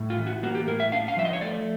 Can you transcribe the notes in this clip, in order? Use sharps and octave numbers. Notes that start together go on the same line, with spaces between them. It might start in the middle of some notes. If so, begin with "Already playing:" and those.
Already playing: A2
F4
E3
F#4
A#3 F#4
G4
A2 A#4
E5
D4 F5
F5
F3 E5
D#5
C#5
A3 D5